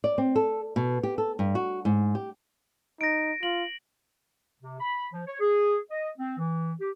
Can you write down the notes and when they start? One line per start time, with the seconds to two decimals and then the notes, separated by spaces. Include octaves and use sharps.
0.04 D5
0.18 C4
0.36 A4
0.76 B2
1.03 G4
1.18 A4
1.39 G2
1.55 F#4
1.85 G#2
2.15 G4
3.01 D#4 A#6 D7
3.43 F4 F#7
4.61 C3
4.80 B5
5.12 F3
5.26 C#5
5.40 G#4
5.91 D#5
6.18 C4
6.38 E3
6.80 G4